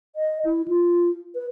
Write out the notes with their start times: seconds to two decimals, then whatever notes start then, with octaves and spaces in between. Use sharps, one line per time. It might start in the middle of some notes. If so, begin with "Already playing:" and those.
0.16 D#5
0.45 E4
0.68 F4
1.35 B4